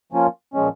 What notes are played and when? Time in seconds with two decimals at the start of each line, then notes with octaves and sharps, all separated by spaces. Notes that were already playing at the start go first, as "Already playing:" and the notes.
0.12 F3 A#3 C#4 F4
0.54 A#2 F3 G#3 C#4